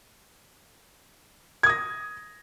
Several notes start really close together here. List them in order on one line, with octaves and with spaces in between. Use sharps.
G#6 D#6 A#6